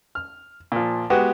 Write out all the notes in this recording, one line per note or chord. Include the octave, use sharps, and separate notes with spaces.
F6
A#2 F3
G#3 B3 F#4 G4